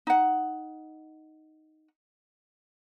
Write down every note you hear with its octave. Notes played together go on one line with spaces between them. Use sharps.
D#4 F#5